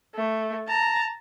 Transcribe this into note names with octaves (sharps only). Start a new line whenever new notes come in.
A3
A5 A#5